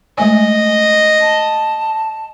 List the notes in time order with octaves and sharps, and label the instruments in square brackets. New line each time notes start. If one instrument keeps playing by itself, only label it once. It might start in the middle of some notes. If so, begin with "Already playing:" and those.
[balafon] G#3 A3 G#5 [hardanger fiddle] D#5
[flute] A5